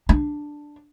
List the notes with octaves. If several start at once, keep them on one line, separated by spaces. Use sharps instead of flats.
D4